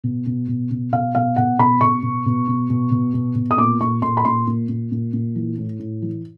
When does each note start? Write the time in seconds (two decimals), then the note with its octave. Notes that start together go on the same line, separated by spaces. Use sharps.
0.04 B2
0.26 B2
0.48 B2
0.71 B2
0.92 B2 F5
1.15 B2 F5
1.36 B2 F#5
1.59 B2 B5
1.81 B2 C#6
2.03 B2
2.26 B2
2.48 B2
2.70 B2
2.91 B2
3.14 B2
3.35 B2
3.51 D#6
3.58 A#2 D6
3.81 A#2 C#6
4.02 A#2 C6
4.17 B5
4.25 A#2 C6
4.47 A#2
4.69 A#2
4.92 A#2
5.13 A#2
5.35 E3
5.58 A2
5.79 A2
6.02 E3